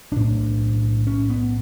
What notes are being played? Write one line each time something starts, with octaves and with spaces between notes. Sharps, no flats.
B1 A2 D4
C#4
B3